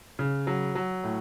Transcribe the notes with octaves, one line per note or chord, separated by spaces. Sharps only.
C#3
F#3
F#3
A2